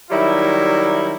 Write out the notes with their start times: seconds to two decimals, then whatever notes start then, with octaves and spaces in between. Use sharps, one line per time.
0.11 D#3 F#3 G3 E4